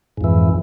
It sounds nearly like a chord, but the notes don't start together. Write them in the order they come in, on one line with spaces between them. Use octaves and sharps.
G#2 F2 E3